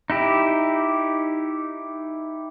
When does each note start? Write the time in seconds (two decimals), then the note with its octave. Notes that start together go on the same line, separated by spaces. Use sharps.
0.10 D#4 E4 G4